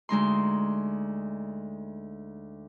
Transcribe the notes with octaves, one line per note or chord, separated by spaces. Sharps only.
D2 G#3 D#4 C6